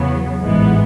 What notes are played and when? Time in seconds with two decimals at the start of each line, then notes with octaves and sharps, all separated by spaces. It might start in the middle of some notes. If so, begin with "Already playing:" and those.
Already playing: E2 C#3 F#3 B3
0.41 A1 G#2 E3 G#3 B3